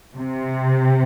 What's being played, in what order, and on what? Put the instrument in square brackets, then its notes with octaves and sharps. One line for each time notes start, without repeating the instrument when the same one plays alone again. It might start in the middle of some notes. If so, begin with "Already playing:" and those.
[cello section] C3